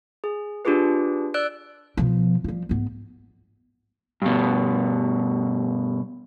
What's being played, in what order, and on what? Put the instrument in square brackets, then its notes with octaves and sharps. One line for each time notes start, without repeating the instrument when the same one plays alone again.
[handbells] G#4
D4 F4 G4 G#4 B4
D5 E6 F#6 D7
[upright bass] B2 F3
F3 G3
G#2 B3
[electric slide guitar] G2 B2